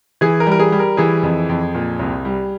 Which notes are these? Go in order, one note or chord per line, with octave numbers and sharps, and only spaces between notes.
E3 G#4
A#4
G3
A#4
G#4
G3
A#4
E3 G#4
F2
F2
A#2
C2
G3